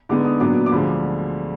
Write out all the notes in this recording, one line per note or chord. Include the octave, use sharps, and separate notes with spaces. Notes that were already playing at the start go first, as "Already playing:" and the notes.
D3 G#3 B3 D#4 D6
D#6
A#2 F#3 B3 D4 D6
D6
D2 D3 F3 G#3 B5